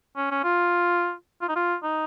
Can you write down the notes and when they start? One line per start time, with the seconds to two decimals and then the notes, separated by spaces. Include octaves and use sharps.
0.16 C#4
0.31 C#4
0.44 F4
1.42 F4
1.49 D#4
1.56 F4
1.84 D#4